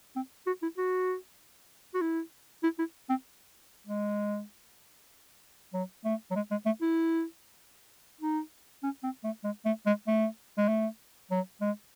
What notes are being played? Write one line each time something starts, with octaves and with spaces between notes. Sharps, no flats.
C4
F#4
E4
F#4
F#4
E4
E4
E4
C4
G#3
F#3
A3
F#3
G#3
G#3
A3
E4
D#4
C#4
C4
A3
G#3
A3
G#3
A3
G#3
A3
F#3
G#3